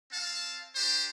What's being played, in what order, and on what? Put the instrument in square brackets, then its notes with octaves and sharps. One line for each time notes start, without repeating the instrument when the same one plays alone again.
[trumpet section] C4 F5 A5
D4 G4 C5